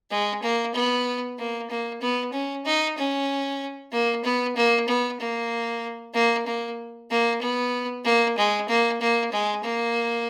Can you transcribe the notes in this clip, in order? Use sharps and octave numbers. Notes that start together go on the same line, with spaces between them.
G#3
A#3
B3
A#3
A#3
B3
C#4
D#4
C#4
A#3
B3
A#3
B3
A#3
A#3
A#3
A#3
B3
A#3
G#3
A#3
A#3
G#3
A#3